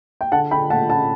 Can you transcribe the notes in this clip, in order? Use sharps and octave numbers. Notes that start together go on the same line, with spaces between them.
G5
D3 F#5 A5
D3 G5 B5
A3 F#5 A5
C#4 F#5 A5